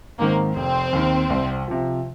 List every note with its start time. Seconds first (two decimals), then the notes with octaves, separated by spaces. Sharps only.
0.18 G#2 D#3 A#3 C4
0.56 F1 C4
0.93 D#2 D#3
1.30 C2
1.68 C3 F3